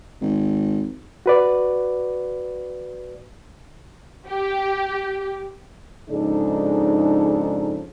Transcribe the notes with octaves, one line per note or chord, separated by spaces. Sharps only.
G#1
F#4 B4 D5
G4
G#2 C#3 F3 D4 D#4 A4